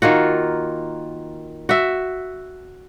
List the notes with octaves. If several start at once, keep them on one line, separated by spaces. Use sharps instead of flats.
D#3 A#3 F4 F#4
F#4 E5